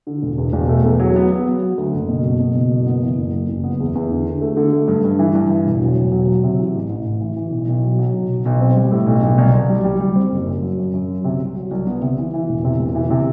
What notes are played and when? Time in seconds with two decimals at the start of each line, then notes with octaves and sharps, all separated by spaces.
0.07 D3
0.22 E1
0.38 E2
0.53 E1
0.69 A3
0.85 E2
0.99 F#3
1.16 B3
1.31 B3
1.46 F#3
1.62 F#3
1.78 D2
1.93 F#1
2.09 B2
2.25 F#1
2.40 B2
2.55 B2
2.70 F#1
2.86 B3
3.02 E3
3.18 F#1
3.33 F#1
3.49 F#1
3.64 B3
3.80 E2
3.95 E2
4.11 D3
4.26 D3
4.41 A3
4.57 D3
4.73 A3
4.88 G2
5.04 G2
5.19 E3
5.35 G2
5.50 E3
5.66 E1
5.81 F#3
5.96 E1
6.12 F#3
6.28 F#3
6.44 C3
6.59 E3
6.74 A1
6.90 A1
7.05 A1
7.20 E3
7.36 E3
7.51 B1
7.68 B1
7.82 F#3
7.99 F#3
8.14 B1
8.29 B1
8.46 B1
8.61 C4
8.76 G3
8.92 A2
9.06 B1
9.23 B1
9.38 C2
9.54 C2
9.69 G3
9.84 G3
10.00 G3
10.16 C4
10.32 F#1
10.46 F#2
10.62 F#3
10.78 F#2
10.94 F#2
11.09 F#3
11.24 C3
11.40 C2
11.55 F#3
11.71 C2
11.87 B3
12.02 C3
12.18 E3
12.34 E3
12.49 E1
12.65 C3
12.79 E1
12.95 E3
13.10 C3